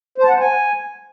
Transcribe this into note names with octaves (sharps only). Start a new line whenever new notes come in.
C5
A5
F#5
C5
G#5